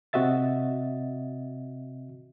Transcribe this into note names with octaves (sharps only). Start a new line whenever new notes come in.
C3 C4 F#4 D#5 E5 A6